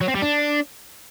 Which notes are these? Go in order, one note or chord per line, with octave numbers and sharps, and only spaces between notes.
F#3
C4
G3
D4